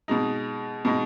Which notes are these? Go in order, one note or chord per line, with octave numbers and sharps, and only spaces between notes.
B2 G#3 D#4
B2 G#3 D#4